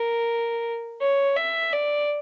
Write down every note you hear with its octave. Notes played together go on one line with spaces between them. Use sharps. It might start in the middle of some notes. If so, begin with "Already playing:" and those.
Already playing: A#4
C#5
E5
D5